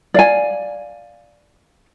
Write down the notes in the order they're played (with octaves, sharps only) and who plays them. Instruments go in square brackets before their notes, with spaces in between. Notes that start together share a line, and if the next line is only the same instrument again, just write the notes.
[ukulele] D5 F5 G#5